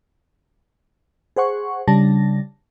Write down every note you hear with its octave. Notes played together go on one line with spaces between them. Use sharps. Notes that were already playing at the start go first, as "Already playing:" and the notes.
G#4 C5 F#5 C#6
C#3 G3 D4 A5 A#6